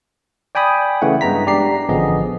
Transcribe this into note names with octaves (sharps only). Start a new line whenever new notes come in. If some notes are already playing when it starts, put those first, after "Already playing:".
D5 G5 G#5 B5 D#6
C#3 E3 A3 F#5
G2 G#3 B3 A#5 B6
D4 G4 D5 A#5 C7
A1 D3 F3 B3 G#4 D#5